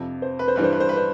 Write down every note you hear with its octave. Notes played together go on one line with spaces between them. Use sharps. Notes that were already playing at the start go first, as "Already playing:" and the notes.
Already playing: F2 C3 F3
C5
B4
C5
G2 E3 G3 B4
C5
B4
C5
B4
C5